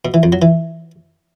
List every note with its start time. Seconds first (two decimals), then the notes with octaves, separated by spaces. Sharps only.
0.05 B2
0.14 E3
0.23 F2
0.32 F#3
0.42 E3